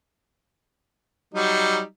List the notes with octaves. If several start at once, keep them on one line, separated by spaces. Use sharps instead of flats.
F#3 G3 D#4